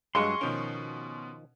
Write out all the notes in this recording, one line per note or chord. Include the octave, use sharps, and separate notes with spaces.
G2 F#3 G#3 G#4 D#5 F5 C6 C#6
B2 D#3 F3 C#4 A#4